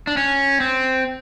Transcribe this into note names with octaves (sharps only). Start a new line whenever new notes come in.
D4
C#4
C4